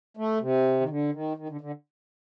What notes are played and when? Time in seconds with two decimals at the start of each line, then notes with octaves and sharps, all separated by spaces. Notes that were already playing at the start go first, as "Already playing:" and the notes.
0.17 A3
0.41 C3
0.80 D#3
0.89 D3
1.13 D#3
1.37 D#3
1.49 D3
1.61 D3